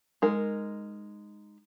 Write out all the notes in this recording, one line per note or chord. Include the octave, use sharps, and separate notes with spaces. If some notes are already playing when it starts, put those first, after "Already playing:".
G#3 D#4 A#4